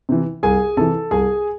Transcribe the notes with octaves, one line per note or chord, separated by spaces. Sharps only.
C3 E3
C2 G#4 G#5
C3 E3 A4 A5
C2 G#4 G#5